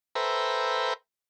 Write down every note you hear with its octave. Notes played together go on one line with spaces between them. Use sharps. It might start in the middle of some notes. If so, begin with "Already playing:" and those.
A4 B4 C5 E5 G5 A#5